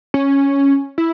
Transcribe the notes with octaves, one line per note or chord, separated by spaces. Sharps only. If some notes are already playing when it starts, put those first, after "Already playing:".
C#4
E4